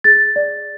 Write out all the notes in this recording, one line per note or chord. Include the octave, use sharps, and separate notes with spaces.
G#4 A6
D5